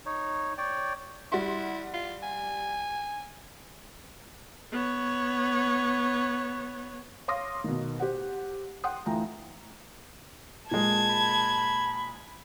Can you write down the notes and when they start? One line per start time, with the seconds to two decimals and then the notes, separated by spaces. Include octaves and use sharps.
0.06 D#4 C#5
0.58 C#5 D5 G5
1.32 G3 E4 F#5 C6
1.94 F4
2.23 G#5
4.72 B3 C#5
7.28 C#5 F5 C6 D6 D#6 A#6
7.64 B2 D#3
8.00 G4 C5 F#5
8.84 F#5 G5 C6 D#6
9.06 D2 E3 F4 G5 A#5
10.71 A#2 G#3 A5 G#6
11.10 B5